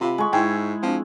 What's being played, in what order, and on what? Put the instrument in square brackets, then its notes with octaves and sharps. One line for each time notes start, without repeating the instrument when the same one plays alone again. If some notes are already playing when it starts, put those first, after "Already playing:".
[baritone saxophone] C3 [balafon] F4 F5 [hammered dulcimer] B5
[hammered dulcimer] G#3 C#6
[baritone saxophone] G#2 [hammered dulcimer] E4 [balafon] G5
[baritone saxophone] F3 [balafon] C4 D4